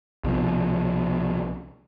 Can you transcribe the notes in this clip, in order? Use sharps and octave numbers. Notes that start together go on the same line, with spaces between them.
C2 B2 D#3 F3